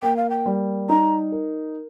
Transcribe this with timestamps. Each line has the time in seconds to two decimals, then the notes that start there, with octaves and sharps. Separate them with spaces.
0.02 A#3 G5
0.17 F5
0.30 G5
0.46 G3
0.89 D#4 A#5
1.32 A#4